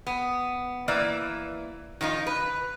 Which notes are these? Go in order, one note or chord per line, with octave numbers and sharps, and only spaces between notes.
B3
E3 A#3 B4 D5 E5
D#3 F3 D#4 F4
B4